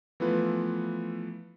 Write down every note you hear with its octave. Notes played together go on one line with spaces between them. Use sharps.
E3 F3 A3 B3 F4 B4